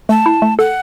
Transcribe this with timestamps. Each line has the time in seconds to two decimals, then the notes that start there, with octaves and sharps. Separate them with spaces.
0.09 A3 A5
0.26 E4
0.42 A3
0.59 A4 F#5